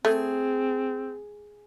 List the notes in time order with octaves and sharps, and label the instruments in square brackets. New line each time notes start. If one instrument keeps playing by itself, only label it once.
[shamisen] A3 [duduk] C4 [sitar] G#4